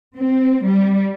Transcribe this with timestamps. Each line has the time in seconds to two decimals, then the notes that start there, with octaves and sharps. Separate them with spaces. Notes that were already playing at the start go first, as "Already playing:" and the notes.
0.16 C4
0.64 G3